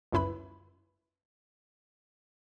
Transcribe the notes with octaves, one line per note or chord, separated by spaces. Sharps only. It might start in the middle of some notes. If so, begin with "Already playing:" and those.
G1 C#2 F#2 E4 B4 B5